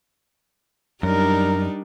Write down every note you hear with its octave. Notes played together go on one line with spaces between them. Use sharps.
F#2 G3 D4 D#4 A#4